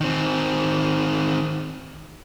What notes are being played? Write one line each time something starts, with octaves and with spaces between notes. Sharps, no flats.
D#3 C4